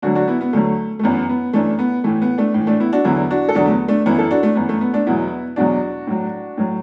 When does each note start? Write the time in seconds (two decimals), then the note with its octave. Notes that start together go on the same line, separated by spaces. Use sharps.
0.02 D2 D3 F#3 D4 F#4
0.15 D4 F#4
0.28 B3 E4
0.41 B3
0.53 D2 D3 F#3 A3
0.99 A3
1.03 F#2 E3 B3
1.29 B3
1.53 F#2 E3 A3 D4
1.79 B3
2.04 A2 E3 A3
2.22 B3
2.38 A3 D4
2.54 A2 E3
2.67 A3 D4
2.80 B3 E4
2.93 D4 F#4
3.04 E2 D3 F#3 B3 E4
3.31 D4 F#4
3.49 A4
3.55 E2 D3 F#3 D4 F#4
3.66 A3
3.72 B3
3.88 A3 D4
4.06 F#2 E3 B3 E4
4.18 E4 A4
4.31 D4 F#4
4.43 A3 D4
4.56 F#2 E3 B3
4.69 A3
4.81 B3
4.93 A3 D4
5.07 E2 B2 F#3 B3 E4
5.56 E2 B2 F#3 D4 F#4
6.07 A2 F#3
6.57 A2 F#3